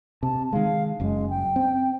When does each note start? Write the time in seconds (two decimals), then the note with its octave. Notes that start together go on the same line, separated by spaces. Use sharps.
0.23 C3 A5
0.53 D#3 G#3 F5
1.00 F#1 F#2 G#3
1.30 G5
1.56 C4